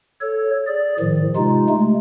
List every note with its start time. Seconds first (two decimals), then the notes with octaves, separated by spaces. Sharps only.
0.21 A4 C#5
0.67 G#4 D5
0.99 A2 D#3 F3
1.36 C3 G#3 D#4 F4
1.69 G#3 A3